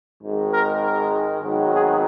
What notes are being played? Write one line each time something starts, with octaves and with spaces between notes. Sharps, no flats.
G#1 G#2 D#3 G#3
A#4
A#4
G#1 G#2 D#3 F#3 B3
G#4